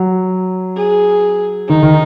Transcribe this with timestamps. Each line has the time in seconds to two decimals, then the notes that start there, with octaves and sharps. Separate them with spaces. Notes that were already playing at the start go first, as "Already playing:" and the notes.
Already playing: F#3
0.76 G#4
1.69 D#3 D#4
1.83 D#3